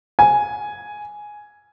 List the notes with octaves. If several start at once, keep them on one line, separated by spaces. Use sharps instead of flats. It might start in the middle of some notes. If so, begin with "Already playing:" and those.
G#5